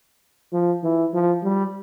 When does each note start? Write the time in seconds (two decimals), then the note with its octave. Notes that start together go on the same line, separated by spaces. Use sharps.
0.53 F3
0.83 E3
1.13 F3
1.43 G3